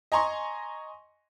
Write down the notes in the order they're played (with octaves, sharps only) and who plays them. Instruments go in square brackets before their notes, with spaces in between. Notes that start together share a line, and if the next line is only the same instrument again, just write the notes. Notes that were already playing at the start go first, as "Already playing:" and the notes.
[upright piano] D#5 G#5 A#5 C6 C#6